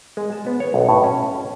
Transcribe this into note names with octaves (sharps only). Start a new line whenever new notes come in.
G#3
A5
B3
C#5
B1
A2
C#4